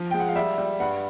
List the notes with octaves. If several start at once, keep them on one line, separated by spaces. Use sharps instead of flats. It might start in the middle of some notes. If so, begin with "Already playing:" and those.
Already playing: F3
G#3 G5
F#5
F5
G3 E5
G3
G2 F#5